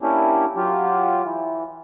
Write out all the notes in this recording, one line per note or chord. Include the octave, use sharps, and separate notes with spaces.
A#3 C#4 D4 E4 G4
F#3 F4 G4
E3